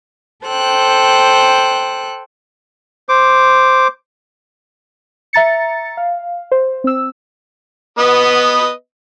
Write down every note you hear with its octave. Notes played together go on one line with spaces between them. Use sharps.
A4 C5 G5 F#6
C5 D6
E5 A#5 A6 C#7
F5
C5
C4 E6
B3 B4 D#5